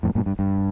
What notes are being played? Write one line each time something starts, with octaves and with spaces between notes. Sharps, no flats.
F2 A2
G2 A#2
G2
G2